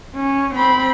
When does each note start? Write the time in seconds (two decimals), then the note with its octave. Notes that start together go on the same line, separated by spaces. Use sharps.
0.16 C#4
0.55 C4 B5